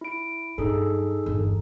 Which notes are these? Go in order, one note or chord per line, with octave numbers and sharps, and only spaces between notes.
E4 D7
G2 F#3 D#4 G#4 A4
G1 E2